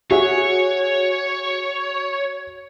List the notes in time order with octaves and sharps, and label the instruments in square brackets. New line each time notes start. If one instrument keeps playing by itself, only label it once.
[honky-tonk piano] F#4 G#4 E5 [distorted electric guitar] C#5